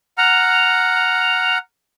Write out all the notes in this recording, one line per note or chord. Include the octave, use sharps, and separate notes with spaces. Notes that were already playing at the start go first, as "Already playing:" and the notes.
F#5 A#5 F6